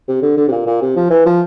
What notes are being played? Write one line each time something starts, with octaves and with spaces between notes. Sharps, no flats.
C3
D3
D3
C3
A#2
A#2
C3
F3
E3
F3